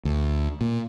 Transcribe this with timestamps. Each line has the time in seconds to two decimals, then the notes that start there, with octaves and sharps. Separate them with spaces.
0.05 D2
0.61 A#2